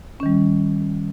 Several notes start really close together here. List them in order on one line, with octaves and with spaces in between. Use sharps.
C#4 D#3 G3